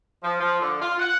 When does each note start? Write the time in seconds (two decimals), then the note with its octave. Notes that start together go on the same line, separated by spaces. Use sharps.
0.23 F3
0.41 F3
0.61 D3
0.82 F4
0.99 F#5